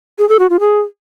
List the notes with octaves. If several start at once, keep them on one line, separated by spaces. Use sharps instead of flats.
G#4
A4
F#4
F4
G#4